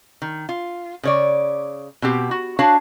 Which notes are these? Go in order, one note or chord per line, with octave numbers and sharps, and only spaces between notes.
D#3
F4
C#3 C#5 D5
B2 C4 G4
F#4
D4 F#4 C#5 F5 A5